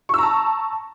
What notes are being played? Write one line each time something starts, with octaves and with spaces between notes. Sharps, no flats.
A5 A#5 C#6 E6